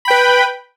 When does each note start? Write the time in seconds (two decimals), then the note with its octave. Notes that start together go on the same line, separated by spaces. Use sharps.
0.05 B5
0.08 G5
0.10 B4